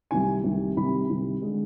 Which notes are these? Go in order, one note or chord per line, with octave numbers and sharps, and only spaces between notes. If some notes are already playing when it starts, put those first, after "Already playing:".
C2 C3 D#3 G#5
C2 C3 D#3
C2 C3 D#3 B5
C2 C3 D#3
D3 G#3